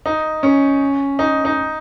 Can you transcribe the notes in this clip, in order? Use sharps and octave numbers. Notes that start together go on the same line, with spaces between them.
D#4
C#4
D#4
D#4